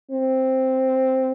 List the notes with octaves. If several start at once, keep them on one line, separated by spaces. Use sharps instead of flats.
C4